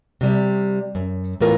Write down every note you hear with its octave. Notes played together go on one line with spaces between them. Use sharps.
C3 G3
F#2
A2 E3 B3 F4 A#4 C#5